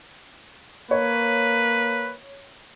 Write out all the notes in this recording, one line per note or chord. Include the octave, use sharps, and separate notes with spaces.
A#3 B4 C#5